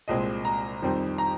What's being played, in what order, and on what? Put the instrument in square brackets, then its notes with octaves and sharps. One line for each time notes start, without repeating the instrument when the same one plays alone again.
[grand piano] C2 A#2 G#3 C4 D#5
A#5
F2 D#3 G3 C4
A#5